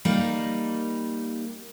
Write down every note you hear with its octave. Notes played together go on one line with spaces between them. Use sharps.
G3 A#3 D#4